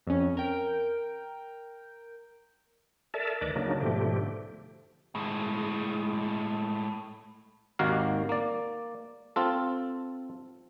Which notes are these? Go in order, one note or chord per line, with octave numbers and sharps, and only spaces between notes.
F2 C#4
A#4 G5
A4 A#4 D5 E5 A5
D2 D#3 B4 D5 D#5 D6
C#3 F#3 A#3 D4 D#4
G#2 B2 D3 F3 A3 G4
A2 G#3
G#1 D#2 D#3 A#3 F#4 F5
A#3 D5
C4 F4 A4